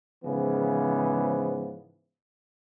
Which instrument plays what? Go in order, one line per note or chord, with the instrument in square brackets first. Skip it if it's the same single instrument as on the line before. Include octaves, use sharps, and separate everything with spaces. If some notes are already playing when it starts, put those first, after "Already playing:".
[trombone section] G#2 C#3 E3 F3 B3